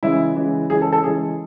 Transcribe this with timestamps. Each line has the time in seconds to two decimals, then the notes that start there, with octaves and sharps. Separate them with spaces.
0.03 C#3 E3 G#3 E4
0.36 C#3 E3 G#3
0.70 C#3 E3 G#3 G#4
0.82 A4
0.93 A4
1.04 C#3 E3 G#3 G#4